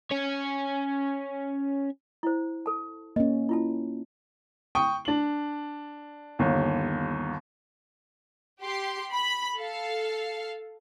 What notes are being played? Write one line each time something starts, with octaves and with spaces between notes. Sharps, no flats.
C#4 C#5
E4 C5
A4 A5
A#3 C#4 D#5
E4 F4 A5
G5 C#6 D#6
D4 F#7
G1 D#2
G4 C6
B5
A4 F5